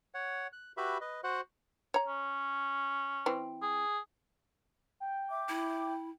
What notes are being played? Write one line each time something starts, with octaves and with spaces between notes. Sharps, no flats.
C#5 F#5
F#6
F#4 G4 B4 E5 B5
B4 D#5
F#4 C5 F#5 F#6
C#5 A#5
C#4
E3 C4
G#4
G5
E5 D6
E4